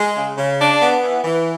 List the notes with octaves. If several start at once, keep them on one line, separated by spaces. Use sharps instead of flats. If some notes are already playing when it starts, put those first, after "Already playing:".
Already playing: G#3
C#3
C#3
D4
B3
E3
E3